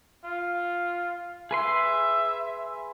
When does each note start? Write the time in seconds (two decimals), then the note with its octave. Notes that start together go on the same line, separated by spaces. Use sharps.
0.25 F4
1.51 G#4 B4 E5 C6